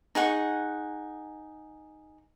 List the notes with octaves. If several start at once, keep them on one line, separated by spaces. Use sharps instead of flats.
D#4 G#4 F#5 C#6